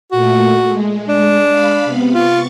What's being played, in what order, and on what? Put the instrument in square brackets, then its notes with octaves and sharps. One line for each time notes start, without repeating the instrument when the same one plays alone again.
[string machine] A#2 A3 [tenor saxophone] F#4
[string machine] G#3
[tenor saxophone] D4
[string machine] F5 B5
C3 B3
[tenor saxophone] F4 [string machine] C#6 A6